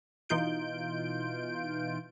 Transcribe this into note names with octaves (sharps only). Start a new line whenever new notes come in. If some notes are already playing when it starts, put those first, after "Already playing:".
B2 E3 D#4 F4 G6 D7